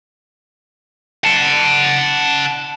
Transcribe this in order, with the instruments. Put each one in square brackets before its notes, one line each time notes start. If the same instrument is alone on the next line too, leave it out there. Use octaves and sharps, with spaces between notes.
[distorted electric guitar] F#5 A5